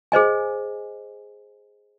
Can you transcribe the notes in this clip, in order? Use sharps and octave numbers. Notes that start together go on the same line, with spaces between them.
G#4 C5 D#5 G#5